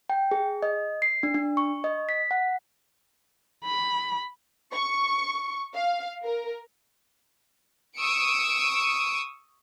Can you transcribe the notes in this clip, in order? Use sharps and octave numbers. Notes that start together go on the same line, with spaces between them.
G5
G#4
D#5
C7
D4
D4
C#6
D#5
B6
F#5
B5
C#6
F5
A#4
C#6 D#6 E6 C#7 D7